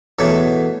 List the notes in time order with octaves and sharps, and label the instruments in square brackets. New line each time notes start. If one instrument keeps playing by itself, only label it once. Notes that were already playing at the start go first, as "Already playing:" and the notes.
[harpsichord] E2 B2 A3 A4 C#5